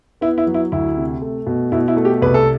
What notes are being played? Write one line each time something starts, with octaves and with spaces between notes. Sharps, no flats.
B3 E4
E4
F#3
E4
D2 E4
C3
A3
B2
B2 E4
E4
A3
G4
C2 B4
A4